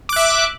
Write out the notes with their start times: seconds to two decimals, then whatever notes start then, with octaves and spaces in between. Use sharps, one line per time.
0.09 D6
0.13 F#6
0.16 E5